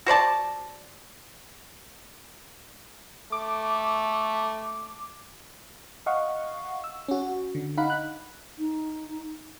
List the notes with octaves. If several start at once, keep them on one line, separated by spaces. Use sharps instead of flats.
F#4 C5 D5 A5
A3 D6
D#5 F5 F#5 C#6
E6
C#4 F#4
D3
D#4 F5 F#5 B5
F#6
D#4